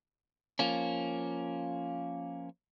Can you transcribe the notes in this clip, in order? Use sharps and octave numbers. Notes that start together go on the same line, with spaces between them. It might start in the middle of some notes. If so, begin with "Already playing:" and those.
F3 A#3 C#4